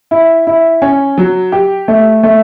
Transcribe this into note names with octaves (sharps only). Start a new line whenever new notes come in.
E4
E4
C#4
F#3
G4
A3
A3